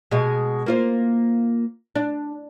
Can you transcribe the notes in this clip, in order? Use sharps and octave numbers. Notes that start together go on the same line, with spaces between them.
B2 G#3
A#3 F4 C5
D4